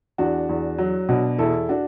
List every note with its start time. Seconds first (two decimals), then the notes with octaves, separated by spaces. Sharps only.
0.18 E2 D4 F#4
0.49 E2
0.78 F#3
1.09 B2 D4 F#4
1.39 E2 E4 A4
1.69 D4 F#4